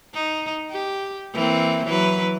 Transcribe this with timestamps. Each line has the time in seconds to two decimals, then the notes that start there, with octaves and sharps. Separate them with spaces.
0.14 D#4
0.70 G4
1.34 E3 A#3 C4
1.85 E3 F#3 B4